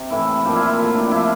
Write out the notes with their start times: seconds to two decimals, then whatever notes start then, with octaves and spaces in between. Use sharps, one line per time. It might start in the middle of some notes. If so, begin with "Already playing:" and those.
Already playing: C3
0.10 A2 E3 E4
0.44 A#2 F3 G4
0.56 E4
0.67 E4
0.78 A2 F3 E4
0.95 D4
1.06 D4
1.11 C3 F3 E4